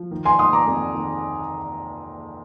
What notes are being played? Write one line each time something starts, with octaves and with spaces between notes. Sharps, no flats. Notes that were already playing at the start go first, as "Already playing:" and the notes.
Already playing: F3
D#3
G#5 C6
D#3 C6 D#6
A#5 D6
F2
D#3